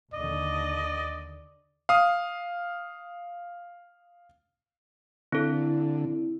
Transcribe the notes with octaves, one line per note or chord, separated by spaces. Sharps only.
D#2 D3 D5 D#5
F5 D#6
D3 C4 E4 A4